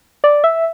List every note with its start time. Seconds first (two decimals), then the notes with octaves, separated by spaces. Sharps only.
0.24 D5
0.44 E5